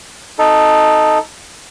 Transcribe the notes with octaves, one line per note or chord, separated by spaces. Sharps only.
D#4 A4